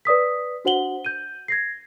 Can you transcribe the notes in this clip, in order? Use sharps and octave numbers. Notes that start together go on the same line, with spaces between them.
B4 D5 D#6 B6
D4 F#4 C5 F#5 F#7 G7
G6 D#7
G#6 A#6 C7